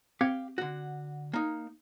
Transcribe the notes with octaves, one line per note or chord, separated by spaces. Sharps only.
C4 G4 F5 G#6 C#7
D3 F#4
A#3 D#4